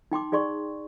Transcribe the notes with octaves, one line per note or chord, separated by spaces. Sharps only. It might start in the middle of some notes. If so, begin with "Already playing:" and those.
D#4 G5 C6 D6
D#4 G#4 D5 C6 C#6